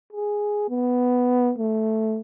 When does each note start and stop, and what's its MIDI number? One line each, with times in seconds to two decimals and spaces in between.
0.13 0.69 68
0.69 1.53 59
1.58 2.20 57